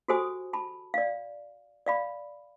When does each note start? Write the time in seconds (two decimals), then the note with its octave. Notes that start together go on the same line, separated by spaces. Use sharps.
0.08 F#4 G4 A4 C5 G#5 D#6
0.53 A5 B5
0.94 D5 F5
1.86 D5 F5 B5